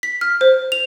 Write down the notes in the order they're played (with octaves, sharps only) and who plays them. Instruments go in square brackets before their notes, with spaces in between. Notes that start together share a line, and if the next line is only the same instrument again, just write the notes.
[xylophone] B6
F6
C5
F7